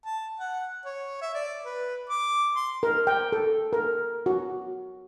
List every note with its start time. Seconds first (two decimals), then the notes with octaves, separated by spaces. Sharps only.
0.06 A5
0.40 F#5
0.85 C#5
1.21 E5
1.34 D5
1.65 B4
2.10 D6
2.56 C6
2.83 A#4
3.07 G5
3.32 A4
3.73 A#4
4.26 F#4